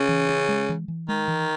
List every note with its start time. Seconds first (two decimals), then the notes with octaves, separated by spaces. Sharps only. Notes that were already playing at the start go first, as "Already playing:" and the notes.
Already playing: C#3 C#4
0.09 E3
0.29 C#4
0.49 G#3
0.69 E3
0.88 E3
1.09 D#3 G#3
1.28 E3